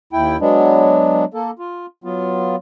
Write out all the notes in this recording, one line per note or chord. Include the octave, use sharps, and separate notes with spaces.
D#2 E4 G5
F#3 G#3 B3 D4
A#3 A4
F4
F#3 B3 F4